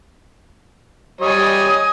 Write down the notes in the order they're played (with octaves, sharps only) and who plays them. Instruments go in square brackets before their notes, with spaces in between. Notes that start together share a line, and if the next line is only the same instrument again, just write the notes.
[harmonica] G3 C#5 [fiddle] D#5 G#5 [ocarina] D#6